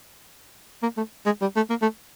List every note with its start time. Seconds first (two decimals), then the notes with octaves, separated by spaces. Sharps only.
0.82 A#3
0.97 A3
1.26 G#3
1.41 G3
1.56 A3
1.70 A#3
1.82 A3